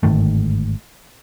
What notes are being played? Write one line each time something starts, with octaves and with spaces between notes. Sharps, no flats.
G1 G#2 D#3 A3